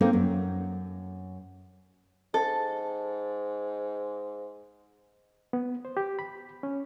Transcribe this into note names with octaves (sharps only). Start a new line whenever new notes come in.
A#3 C4 D#4 A4 A#4
F#2
G#2 A4
B3
C5
G4
B5
C#4